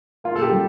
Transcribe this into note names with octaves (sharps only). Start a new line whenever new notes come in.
A#3 F4
A4
G4
G3